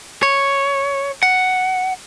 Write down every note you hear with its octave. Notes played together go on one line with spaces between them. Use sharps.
C#5
F#5